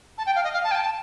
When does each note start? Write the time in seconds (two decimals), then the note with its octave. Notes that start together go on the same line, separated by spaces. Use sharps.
0.18 A5
0.26 G5
0.36 F5
0.44 D#5
0.53 F5
0.64 A5
0.71 G5
0.75 A5